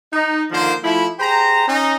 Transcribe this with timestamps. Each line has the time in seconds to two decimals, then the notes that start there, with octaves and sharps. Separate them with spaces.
0.12 D#4
0.50 D3 D#3 F3 A#3 C5
0.83 F3 A3 E4
1.19 G4 G#4 C5 A#5
1.67 C#4 D#4